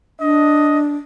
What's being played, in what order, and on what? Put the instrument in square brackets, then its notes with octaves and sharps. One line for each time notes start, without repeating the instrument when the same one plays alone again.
[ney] D4 [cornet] D#5